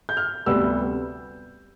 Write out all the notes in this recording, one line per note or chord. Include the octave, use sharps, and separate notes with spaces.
G6
F6
D2 C3 G3 B3 E6